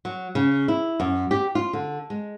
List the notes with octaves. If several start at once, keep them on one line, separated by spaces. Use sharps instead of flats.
F#3
C#3
E4
F#2
G4
F4
D3
G#3